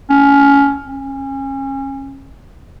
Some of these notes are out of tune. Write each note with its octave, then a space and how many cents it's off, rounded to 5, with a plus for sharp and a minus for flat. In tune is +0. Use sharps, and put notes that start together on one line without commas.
C#4 +20
C#4 -30